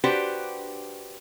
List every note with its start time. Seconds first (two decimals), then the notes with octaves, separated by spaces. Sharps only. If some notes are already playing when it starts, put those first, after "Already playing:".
0.04 D4 F#4 G4 B4 C5